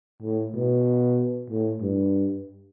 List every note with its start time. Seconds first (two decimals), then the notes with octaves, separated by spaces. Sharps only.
0.22 A2
0.55 B2
1.50 A2
1.82 G2